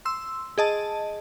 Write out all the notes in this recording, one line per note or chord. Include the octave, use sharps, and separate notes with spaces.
C6 E6
G#4 D#5 A5